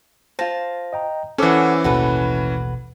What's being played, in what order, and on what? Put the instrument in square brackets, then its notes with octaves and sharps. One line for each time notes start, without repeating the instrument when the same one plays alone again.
[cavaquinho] F4 A5 [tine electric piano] C5 A#6
[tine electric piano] D#5 G5 A#5
[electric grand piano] E3 C#4 [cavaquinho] A4 F#5 [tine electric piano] C5 D6 E6
[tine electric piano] A1 D#2 B2 [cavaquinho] F#4 A4 B4